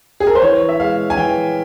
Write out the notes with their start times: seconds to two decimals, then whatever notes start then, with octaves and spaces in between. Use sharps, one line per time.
0.20 G#4
0.27 A#4
0.35 C5
0.42 E3 C#5
0.69 E5
0.80 G#3 F5
1.10 G#5
1.17 E3 G5